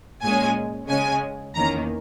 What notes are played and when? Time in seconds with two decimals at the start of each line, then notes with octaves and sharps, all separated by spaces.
0.22 A#2 G#3 C#4 G#5
0.88 C#3 G#3 C#4 G#5
1.54 E2 D#3 A#3 C#4 A#5